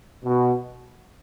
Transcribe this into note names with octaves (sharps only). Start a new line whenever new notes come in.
B2